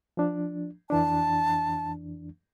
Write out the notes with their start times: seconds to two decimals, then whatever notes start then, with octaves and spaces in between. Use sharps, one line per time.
0.17 F3 D4
0.90 F2 E3 D4 A5